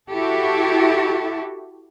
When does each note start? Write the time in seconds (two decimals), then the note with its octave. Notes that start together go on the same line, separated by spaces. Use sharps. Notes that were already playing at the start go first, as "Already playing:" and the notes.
0.11 E4 F#4 G4 A4 E5